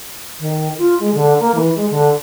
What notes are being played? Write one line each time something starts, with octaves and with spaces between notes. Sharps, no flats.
D#3
F4
G#3
D3
A#3
E3
G#3
D3